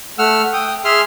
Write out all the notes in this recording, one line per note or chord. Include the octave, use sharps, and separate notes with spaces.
A3 F#5 E6 F6
G5 D#6
G#4 E5 C6 F6